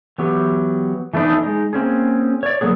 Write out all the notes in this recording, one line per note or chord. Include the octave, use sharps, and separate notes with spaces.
E3 F#3 B3 G4
E3 A3 B3 D4 D#4
G#3 D#4
A#3 C4 C#4 G#4
C#5 D5
D3 F#3 A#3 B3 G#4